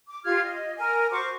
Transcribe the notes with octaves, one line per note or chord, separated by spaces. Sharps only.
D6
F4 G4 F6 G#6
D#5
A#4 G#5
F#4 C5 C#6 D6